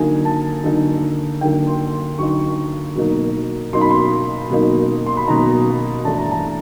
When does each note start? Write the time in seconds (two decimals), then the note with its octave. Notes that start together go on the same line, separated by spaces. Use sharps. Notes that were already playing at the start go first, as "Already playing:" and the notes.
Already playing: D3 F#3 A#3 D#4 G#5
0.25 A5
0.64 D3 F#3 A#3 D#4
1.41 D3 F#3 A#3 D#4 G5
1.67 C6
1.93 C6
2.19 D3 F#3 A#3 D#4 C#6
2.95 B2 F#3 A#3 D#4
3.73 B2 F#3 A#3 D#4 C6
3.81 B5
3.91 C6
4.51 B2 F#3 A#3 D#4
5.06 C6
5.17 B5
5.28 B2 F#3 A#3 D#4 A#5
6.05 G2 E3 A3 D4 A5
6.18 A#5
6.31 A5